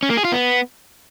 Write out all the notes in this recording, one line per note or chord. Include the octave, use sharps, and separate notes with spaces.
C#4
A#3
G#4
F4
B3